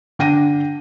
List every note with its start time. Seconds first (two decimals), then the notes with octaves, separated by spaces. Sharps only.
0.19 D3 D4 G5 A#6 D#7